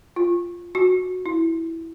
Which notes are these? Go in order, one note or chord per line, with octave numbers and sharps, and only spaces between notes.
F4
F#4
E4